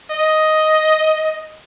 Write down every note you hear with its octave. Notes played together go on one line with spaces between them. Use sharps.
D#5